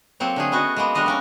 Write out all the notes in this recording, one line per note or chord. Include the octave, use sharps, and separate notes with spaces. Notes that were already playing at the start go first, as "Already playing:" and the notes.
F#3 A#3 C4 A4 C#5
D3 A3 G#4
B3 C#4 F#4 D#5
G#3 A#3 B3
G3 A3 D4 F#4 D#5 F5
A#3 C#4 A#4